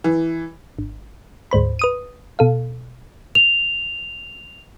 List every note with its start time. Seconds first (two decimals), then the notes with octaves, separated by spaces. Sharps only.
0.04 E3
0.79 G#1
1.51 D2 G#2 C5 B5
1.79 B4 D#6 D#7
2.39 B2 A4 F5
3.35 F7